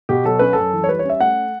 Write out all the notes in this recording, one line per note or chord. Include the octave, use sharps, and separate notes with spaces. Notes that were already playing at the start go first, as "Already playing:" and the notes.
B2 G4
F#3 A4
C#4 B4
F#2 A4
E3
C#5
G3 B4
C#5
C#4 E5
A3 F#5